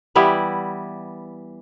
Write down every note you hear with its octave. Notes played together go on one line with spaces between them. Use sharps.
E3 G3 B3 E4